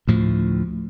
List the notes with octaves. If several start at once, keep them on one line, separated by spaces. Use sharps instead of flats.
D2 A2 F3